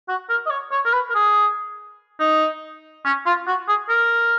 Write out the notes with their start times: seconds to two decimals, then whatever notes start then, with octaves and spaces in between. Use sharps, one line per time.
0.08 F#4
0.29 A#4
0.46 D#5
0.50 C#5
0.72 C#5
0.85 A#4
0.92 B4
1.10 A#4
1.14 G#4
2.20 D#4
3.05 C#4
3.26 F4
3.47 F#4
3.68 G#4
3.89 A#4